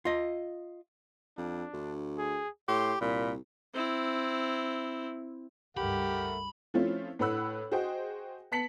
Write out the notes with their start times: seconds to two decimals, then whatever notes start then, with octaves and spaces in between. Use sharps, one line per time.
0.05 F4 D#5
1.38 F2 D4
1.74 D2
2.18 G#4
2.68 A2 G4 C6
3.01 C2 A#2 B5
3.73 C4 E4
5.77 C#2 G2 A3 G4 A#4 F#5 B5
6.74 F3 A3 C4 C#4 E4 F4
7.19 A2 B4 F#5 B5 E6 F#6
7.72 F#4 G#4 C5 D#5 G5
8.52 B3 A5 B6 C#7 F#7